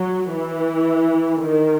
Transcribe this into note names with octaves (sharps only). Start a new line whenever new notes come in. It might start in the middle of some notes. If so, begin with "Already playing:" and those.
Already playing: F#3
E3
D#3